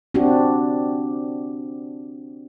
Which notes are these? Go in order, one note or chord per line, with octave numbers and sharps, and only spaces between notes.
C4 D4 F#4 G4